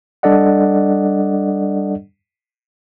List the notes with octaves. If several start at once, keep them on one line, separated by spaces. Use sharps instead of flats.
G3 D4 A4 D5 D#5 F#5